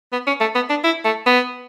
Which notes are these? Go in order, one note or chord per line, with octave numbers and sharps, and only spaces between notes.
B3
C#4
A3
B3
D4
E4
A3
B3